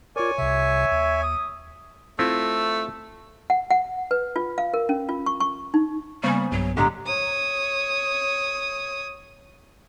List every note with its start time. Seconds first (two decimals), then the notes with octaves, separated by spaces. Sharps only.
0.16 F4 A#4 C#5 D5 G#5
0.38 C2 C3 E5
0.92 D#2
1.23 D#6
2.19 A3 C4 E4 F4
3.50 F#5
3.70 F#5
4.11 B4
4.36 F4
4.58 F5
4.74 A#4
4.89 C#4
5.09 F4
5.26 C#6
5.41 C#6
5.74 D#4
6.24 C#3 G3 A#3 B3 C5 G#5
6.52 B1 G2 F#3
6.77 A2 D3 G#3 G4 A#5
7.06 C#5 D#6